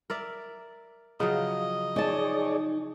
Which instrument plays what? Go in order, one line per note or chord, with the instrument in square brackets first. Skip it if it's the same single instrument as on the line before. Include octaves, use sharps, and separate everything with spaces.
[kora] A#4 D5 E5
[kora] C#3 F3 F#3 [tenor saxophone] D#5
[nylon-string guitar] D#4 A5 [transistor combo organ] G#4 C#5 D5